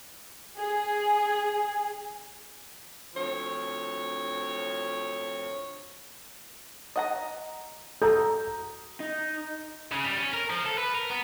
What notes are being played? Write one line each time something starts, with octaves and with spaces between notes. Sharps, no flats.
G#4
D2 F3 C4 C#5
D#5 F#5 A#5
F#4 A4 A#5 D#6 G6
D#4
C#3
G3
C#4
A#4
F3
A4
B4
A#4
B3